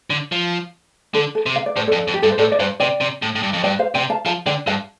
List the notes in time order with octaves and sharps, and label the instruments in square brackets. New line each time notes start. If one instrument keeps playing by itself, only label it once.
[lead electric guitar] D3
F3
[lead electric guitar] D3 [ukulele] A4
[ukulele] A4
[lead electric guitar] C3
[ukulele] F5
D5
[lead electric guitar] A2 [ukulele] C5
[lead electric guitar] F2 [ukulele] A4 D5
[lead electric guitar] F2
[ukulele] G4
[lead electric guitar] G2 [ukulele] A4
[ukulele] C5
[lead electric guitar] A2 [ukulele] A4 D5
[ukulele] D5
[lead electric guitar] G2 [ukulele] C5 F5
[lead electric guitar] C3 [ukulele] D5 G5
[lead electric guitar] C3
A2
A2
G2
F2
[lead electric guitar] G2 [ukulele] D5 G5
[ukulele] C5 F5
[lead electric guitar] C3 [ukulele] D5 G5
[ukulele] F5 A5
[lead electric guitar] F3 [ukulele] F5 A5
[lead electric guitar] D3 [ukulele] D5 G5
[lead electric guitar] G2 [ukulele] F5 A5